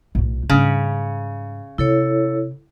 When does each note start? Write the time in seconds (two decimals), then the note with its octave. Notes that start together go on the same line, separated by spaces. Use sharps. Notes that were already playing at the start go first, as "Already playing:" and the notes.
0.15 B1 A2
0.50 G#2 C#3 G3
1.78 C3 E4 A4 C#5